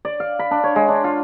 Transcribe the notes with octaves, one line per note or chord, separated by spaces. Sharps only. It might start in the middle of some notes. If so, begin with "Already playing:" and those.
D5
F5
B5
D4
C#5
G#3
D4
F4